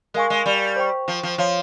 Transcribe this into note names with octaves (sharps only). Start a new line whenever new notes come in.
G#3 A#4 F5 G#5 C#6
G#3
G3
C5 G5 C#6
F3
F3
F3 C#5 F5 C6